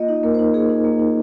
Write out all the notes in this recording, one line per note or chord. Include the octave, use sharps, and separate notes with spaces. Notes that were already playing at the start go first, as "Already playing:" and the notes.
Already playing: A#3 F4 D#5
D#4
D#5
A#3 A#4
D#4 C5
A#3 G#4
D#4
A#3
D#4